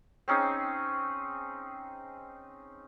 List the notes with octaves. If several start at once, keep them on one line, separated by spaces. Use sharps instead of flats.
C4 C#4 D#4 G#4